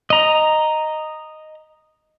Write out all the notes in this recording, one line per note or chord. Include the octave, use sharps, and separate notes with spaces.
D#5 A#5